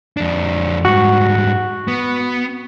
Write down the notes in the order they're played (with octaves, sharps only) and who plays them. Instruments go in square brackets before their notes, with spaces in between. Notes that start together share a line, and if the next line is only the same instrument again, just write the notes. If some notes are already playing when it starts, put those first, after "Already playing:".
[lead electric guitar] F2 D4
[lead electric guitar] G#2 G3 [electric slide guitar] F#4
[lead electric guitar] B3